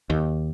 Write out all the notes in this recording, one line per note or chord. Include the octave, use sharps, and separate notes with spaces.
D#2